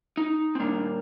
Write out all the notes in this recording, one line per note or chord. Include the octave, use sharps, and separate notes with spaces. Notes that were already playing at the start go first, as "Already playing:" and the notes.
D#4
C4
A#2 G3 A#3 D4